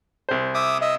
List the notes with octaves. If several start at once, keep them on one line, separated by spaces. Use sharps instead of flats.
C2 C5
E5 D6 D#6
D#5 E5